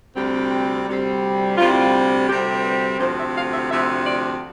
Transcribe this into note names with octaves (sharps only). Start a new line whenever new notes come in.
D2 C3 G3 C4 G4
D2 C3 G3 C4
D2 C3 G3 C4 F4
E4
F4
D2 C3 G3 C4 G4
C5
B4
D2 C3 F3 C5
E5
F5
E5
D2 C3 F3 E5
D5